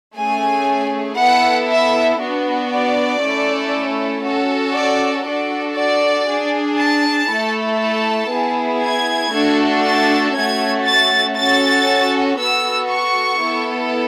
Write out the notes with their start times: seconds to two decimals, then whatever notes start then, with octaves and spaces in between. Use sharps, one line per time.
0.16 A3 C#4 G#4 G#5
1.17 B3 E4 A4 F#5
1.68 E5
2.19 B3 D4 F#4
2.71 D5
3.21 A3 C#4 E4 A4
4.24 C#4 F#4 A4
4.74 D5
5.26 D4 F#4 A4 D5
5.76 D5
6.27 D4 G#4
6.79 A5
7.29 A3 E4 A4
7.79 A5
8.30 B3 E4 G#4
8.82 G#6
9.33 A3 D4 F#4 A4
9.84 A6
10.34 A3 C#4 F#4 A4 G#6
10.85 A6
11.36 C#4 F#4 A4 A6
12.38 B3 F#4 A4 E6
12.89 C#6
13.40 B3 E4 A4